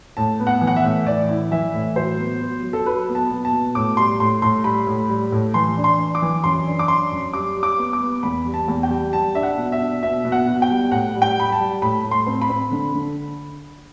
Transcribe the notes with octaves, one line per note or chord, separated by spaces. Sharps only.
A2 A5
B3
F#5
E3
F#5
E5
A2
E3 D5
E4
E3 E5
A2
F#3 C5
B3
F#3
F#3
A4
F#3 B4
B3
A5
B2
A5
B2
A2 D6
G3 C6
A2 C6
A2 C6
G3 B5
A2
G3
A2
E3 C6
D4
C6
D4
D6
E3
F#2 C6
D4
D6
D4 C6
F#2
G3 D6
G3
D6
B3
D6
B3
E2 B5
G3
A5
E2
G5
G3
G3 A5
D4 E5
F#5
B2
E5
D4
B2 E5
B2
F#5
B2
G5
G3
A2 F#5
G3
G5
G3 B5
A5
G3
A2 B5
A2
C6
C4
B5
C4
D3
D3